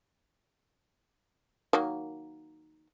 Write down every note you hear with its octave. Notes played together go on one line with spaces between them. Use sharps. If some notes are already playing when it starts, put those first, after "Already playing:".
D#3 F#3 A#3